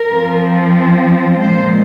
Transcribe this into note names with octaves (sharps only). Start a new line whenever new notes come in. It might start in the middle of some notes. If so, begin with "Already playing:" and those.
Already playing: A#4
F3 C4
A#2 F3 G#3 C5